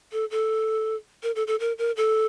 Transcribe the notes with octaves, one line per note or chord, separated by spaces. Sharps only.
A4
A4
A#4
A4
A4
A#4
A#4
A4